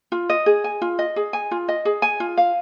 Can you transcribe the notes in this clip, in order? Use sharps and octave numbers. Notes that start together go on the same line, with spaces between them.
F4
D#5
G#4
G#5
F4
D#5
G#4
G#5
F4
D#5
G#4
G#5
F4
F5